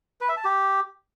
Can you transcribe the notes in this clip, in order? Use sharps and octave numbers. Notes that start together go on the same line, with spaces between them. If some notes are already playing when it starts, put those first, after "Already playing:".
B4
E5
A5
G4